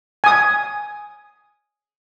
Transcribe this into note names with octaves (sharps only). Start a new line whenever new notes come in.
G#5 D#6